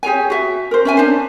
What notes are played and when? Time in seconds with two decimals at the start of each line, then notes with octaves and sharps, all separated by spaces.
0.03 G4 G#4 C#5 G#5
0.30 F#4 E5
0.71 A#4 C5
0.85 C#4 E5 G#5
0.97 D4 C5